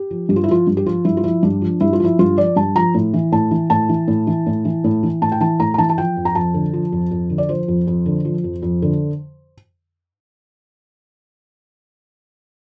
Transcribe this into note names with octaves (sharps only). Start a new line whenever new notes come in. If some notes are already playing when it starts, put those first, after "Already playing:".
Already playing: G4
F3
G2 G4
F4
E4
F3 F4
G2
G4
F3 F4
G2 E4
F4
F3 E4
G2 D4
F3
G2 E4
F4
F3 E4
G2 F4
F3 D5
G2 A5
F3 A#5
A2
E3
A2 A5
E3
A2 A5
E3
A2
E3
A2
E3
A2
E3
A2 A5
G5
E3 A5
A2 A#5
A#5
E3 A5
A5
F3 G5
F2
A#5
F2 A5
D3
F3
F2
F2
D3
D5
F3 C5
F2
F2
D3
F3
F2
F2
D3